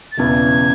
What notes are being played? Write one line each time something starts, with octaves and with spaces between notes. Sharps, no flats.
A6
E1 E2 C#3 E3 G#6